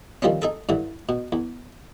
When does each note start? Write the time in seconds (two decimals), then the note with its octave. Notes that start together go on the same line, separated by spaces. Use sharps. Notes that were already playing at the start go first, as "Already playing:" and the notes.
0.22 D#3 F3 G3 C4 C#4
0.42 D#4 G#4 A4
0.69 G2 D3 E3
1.09 B2
1.32 E2